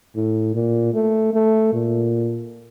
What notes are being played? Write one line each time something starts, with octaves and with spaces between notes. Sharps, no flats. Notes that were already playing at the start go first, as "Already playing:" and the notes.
A2
A#2
A3
A3
A#2